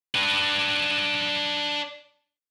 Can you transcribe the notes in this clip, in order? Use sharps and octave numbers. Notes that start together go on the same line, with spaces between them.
D4 B4